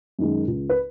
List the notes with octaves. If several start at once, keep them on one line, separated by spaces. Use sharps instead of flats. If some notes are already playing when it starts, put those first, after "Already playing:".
F#2 D#3 G#3
C#2
B4